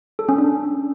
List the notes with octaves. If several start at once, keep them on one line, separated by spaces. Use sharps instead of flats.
A4
C#4
D4